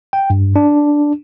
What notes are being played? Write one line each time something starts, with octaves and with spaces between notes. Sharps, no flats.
G5
G2
D4